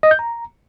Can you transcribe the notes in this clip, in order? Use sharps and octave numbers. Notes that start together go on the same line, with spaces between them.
D#5
G6
A#5